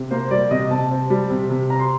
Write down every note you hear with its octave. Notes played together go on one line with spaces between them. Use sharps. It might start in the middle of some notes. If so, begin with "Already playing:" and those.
Already playing: C3
A#3 C5
G3 D5
C3 D#5
C3 A5
C4
G3
C3
C3
C4 A#5
C6